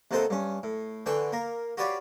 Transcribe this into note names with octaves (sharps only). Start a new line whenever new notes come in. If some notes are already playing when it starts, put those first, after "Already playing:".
D#2 C3 D#4 A4 C5 F#5
G2 C#4
A2
D3 E3 G5 C6 C#6
A#3 A#4
F#4 G4 B4 C#5 D5 F5